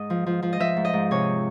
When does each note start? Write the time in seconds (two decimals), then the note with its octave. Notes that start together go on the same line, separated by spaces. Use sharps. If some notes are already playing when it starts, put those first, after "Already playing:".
Already playing: G#2 D#5
0.10 F3
0.26 F3
0.42 F3
0.53 D#5
0.60 F3 E5
0.76 G#2
0.85 D#5
0.93 G#2
1.11 C3 C#5